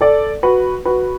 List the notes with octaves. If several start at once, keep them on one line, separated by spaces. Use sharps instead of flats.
A4 D5
F#4 B4
F#4 B4